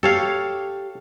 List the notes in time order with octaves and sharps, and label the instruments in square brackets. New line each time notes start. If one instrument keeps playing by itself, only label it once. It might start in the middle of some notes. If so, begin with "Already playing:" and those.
[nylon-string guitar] G4 [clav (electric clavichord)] A4 C#5 F5